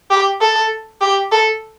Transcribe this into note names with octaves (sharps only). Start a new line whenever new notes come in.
G4
A4
G4
A4